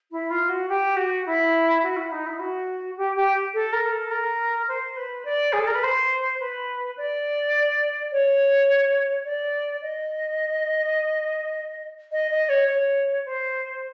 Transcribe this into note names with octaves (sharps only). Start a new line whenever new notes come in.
E4
F4
F#4
G4
F#4
E4
F#4
E4
D#4
E4
F#4
G4
G4
A4
A#4
A4
A#4
C5
B4
D5
G#4
A4
A#4
B4
C5
B4
D5
C#5
D5
D#5
D#5
D#5
C#5
C#5
C5